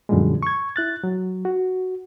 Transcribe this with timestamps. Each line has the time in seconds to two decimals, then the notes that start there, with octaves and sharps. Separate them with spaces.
0.09 F#2 A#2 D3 F3 G3 G#3
0.43 C#6 G#6
0.76 E4 F#6 A6
1.04 F#3
1.45 F#4